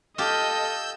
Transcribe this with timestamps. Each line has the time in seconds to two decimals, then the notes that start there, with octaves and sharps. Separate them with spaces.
0.18 F4 G4 A4 D#5 E6 G6